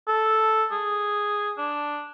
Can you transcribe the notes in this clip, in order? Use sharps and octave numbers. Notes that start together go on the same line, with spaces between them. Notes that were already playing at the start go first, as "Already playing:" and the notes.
A4
G#4
D4